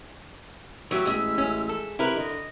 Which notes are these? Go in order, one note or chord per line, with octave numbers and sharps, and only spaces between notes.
A1 F#3 G4 E5 E6
A1 G#3 E5
C#4
A4
C3 E4 A#4 B4
D3 D#5